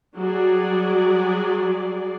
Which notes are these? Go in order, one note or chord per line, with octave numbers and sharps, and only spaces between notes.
F#3 G3 G#4 D5